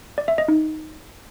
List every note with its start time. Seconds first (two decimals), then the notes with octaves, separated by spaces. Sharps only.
0.18 D5
0.28 E5
0.38 D#5
0.48 D#4